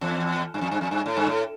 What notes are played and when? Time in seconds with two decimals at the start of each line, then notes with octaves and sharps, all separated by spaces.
0.01 E2
0.54 G2
0.61 F2
0.71 G2
0.81 F2
0.91 G2
1.06 A2
1.17 G2
1.27 A2